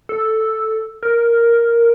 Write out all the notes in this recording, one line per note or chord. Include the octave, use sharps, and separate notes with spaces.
A4
A#4